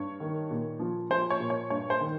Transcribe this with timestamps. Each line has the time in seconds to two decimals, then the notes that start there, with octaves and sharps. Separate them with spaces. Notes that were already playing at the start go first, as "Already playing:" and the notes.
Already playing: G2 C#5
0.20 D#3
0.51 A#2
0.80 F3
1.10 F3 C5
1.30 C#5
1.40 A#2
1.50 C#5
1.70 G2 C#5
1.90 C5
2.01 D#3